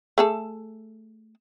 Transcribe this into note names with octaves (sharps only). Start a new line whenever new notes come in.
A3 G#4 A4